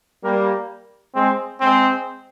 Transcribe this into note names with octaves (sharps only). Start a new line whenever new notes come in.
G3 A#3
G#3 C4
G#3 C4